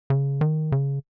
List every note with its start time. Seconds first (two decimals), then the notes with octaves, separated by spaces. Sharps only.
0.10 C#3
0.41 D#3
0.72 C#3